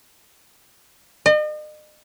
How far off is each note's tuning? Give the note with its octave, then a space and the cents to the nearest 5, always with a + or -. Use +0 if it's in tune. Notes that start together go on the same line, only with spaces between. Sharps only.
D#5 -40